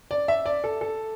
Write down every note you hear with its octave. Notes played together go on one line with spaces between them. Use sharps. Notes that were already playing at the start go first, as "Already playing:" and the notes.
D5
E5
D5
A4
A4